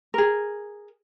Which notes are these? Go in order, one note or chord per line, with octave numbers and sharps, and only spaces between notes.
G#4 A#4